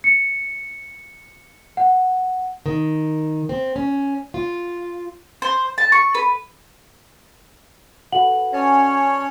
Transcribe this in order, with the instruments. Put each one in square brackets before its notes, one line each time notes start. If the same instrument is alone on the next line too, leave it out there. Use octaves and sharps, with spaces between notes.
[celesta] C#7
F#5
[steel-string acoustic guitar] D#3
C4
C#4
F4
[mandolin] C5
A5
C#6
B4
[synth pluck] F#4 A4 B4 [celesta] F#5 F#7
[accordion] C#4 C#5 [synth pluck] D5 G#5 A5